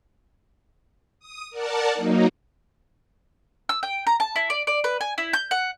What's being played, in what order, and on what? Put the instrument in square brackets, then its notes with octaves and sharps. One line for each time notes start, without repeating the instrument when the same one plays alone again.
[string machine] D#6
A#4 D5 F#5 A5
F#3 A#3 D#4
[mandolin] E6
G5
A#5
A5
E4
D5
D5
B4
G#5
E4
G6
F#5